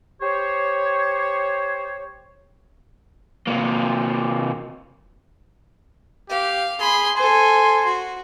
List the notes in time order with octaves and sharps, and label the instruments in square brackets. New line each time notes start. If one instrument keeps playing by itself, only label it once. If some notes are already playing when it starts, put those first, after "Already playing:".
[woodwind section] G4 C5 C#5
[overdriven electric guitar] C3 A#3
[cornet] G4 [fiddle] F5
[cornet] G#4 [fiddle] B5 C6
[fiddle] A4 C5 [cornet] G#5 [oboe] C6
[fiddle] F#4